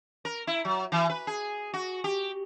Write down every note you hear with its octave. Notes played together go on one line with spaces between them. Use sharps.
A#4
E4
F#3
E3
B4
G#4
F#4
G4